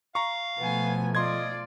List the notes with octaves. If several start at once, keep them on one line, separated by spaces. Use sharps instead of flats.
F5 A#5 C#6
B2 F3 A3 B3 G#5
F4 D5 D#5 C6 G#6